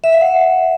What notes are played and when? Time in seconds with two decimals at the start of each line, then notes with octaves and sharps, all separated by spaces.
0.04 E5
0.12 F5
0.21 F#5